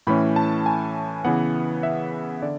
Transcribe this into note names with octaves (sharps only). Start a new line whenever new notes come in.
A2 E3 A3 C#4 B5
A5
G#5
C#3 E3 B3 F#5
E5
D3 D5